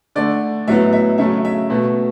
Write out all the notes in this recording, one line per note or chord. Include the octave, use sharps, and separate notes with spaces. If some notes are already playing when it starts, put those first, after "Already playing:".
D3 A3 D5
A2 F#3 B3 E5
E5
C#3 F#3 A3 E5
E5
B2 A3